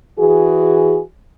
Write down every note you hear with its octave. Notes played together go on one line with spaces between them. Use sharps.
E3 F#4 G#4